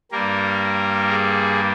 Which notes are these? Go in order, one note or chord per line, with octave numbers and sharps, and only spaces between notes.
G2 G3 A#3 A#4
G#4